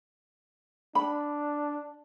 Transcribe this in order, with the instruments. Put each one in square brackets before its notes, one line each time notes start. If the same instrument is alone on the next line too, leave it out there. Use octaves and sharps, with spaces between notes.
[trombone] D4 [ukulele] B5